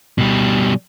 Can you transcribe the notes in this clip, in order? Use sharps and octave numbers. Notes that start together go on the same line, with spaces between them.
B2 G3